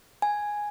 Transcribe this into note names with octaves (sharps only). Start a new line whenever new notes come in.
G#5